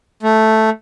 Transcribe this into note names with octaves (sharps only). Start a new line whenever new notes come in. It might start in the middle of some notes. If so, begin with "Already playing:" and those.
A3